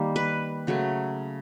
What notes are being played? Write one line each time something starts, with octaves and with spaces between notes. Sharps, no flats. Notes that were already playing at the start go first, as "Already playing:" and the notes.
Already playing: D#3 G3 A#3
B4
C#3 F#3 A3